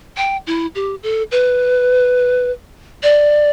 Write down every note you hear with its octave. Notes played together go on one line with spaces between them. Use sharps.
G5
E4
G4
A4
B4
D5